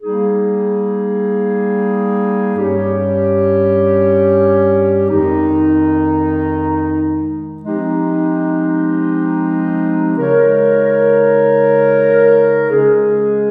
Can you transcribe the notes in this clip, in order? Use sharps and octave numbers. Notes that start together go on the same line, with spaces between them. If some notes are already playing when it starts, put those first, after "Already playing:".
G3 A#3 D#4 G#4
G2 G3 C#4 G4 C#5
F2 D#3 G#3 D#4
F3 G#3 C4 D#4 G4
C#3 G#3 D#4 A#4 C#5
C#3 G#3 C#4 G#4